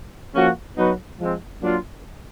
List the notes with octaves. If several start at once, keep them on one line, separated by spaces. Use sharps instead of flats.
F3 A#3 C#4 F#4
F#3 B3 D#4 F#4 B4
F3 G#3 C4
F#3 A#3 D4 F4